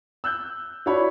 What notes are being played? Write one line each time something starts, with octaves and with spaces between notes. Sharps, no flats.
E6 F#6 G6
D4 E4 F#4 C#5 B5